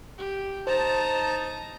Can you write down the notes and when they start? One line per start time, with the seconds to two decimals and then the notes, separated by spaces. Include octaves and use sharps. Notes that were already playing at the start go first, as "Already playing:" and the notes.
0.18 G4
0.67 D#4 C5 A5 A#5